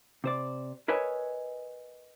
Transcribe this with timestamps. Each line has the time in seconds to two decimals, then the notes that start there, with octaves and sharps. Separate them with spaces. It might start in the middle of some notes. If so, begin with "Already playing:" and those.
0.24 C3 C5 D5
0.88 A#4 B4 C#5 D#5 E5 G#5